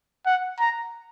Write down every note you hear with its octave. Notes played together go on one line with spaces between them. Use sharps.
F#5
A#5